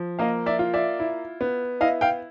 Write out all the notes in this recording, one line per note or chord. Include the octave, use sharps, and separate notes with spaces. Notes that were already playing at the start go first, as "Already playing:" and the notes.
Already playing: F3
A#3 D#5 F5
D5 E5
F4
D5 E5
E4
B3
E4 D#5 F5
F5 G5